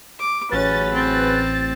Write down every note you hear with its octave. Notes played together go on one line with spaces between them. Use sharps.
D6
A1 F#3 C#4 G#4 B4 A6
C4